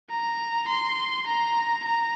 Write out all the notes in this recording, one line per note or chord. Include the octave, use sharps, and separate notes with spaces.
A#5
C6
A#5
A#5